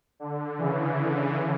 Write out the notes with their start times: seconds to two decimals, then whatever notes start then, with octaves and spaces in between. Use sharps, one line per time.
0.20 D3
0.58 C#3 E3